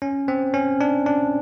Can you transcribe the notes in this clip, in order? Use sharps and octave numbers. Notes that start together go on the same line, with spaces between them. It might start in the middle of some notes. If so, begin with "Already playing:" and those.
C#4
C4
C#4
D4
D4